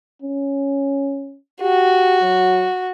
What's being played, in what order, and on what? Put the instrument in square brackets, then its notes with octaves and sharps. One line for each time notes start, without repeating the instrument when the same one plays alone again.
[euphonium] C#4
[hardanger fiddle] F#4 [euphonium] G4
[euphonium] F#3